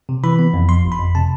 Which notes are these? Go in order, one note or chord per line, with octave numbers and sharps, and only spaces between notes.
C3
E3 B5
B3
F2
F3 C6
G1
B5
F2
C3 A5